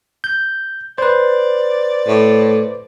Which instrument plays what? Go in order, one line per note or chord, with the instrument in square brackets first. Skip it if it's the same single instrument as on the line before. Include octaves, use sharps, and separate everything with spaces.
[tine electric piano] G6
[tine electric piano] B4 C5 [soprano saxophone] D5
[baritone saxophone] A2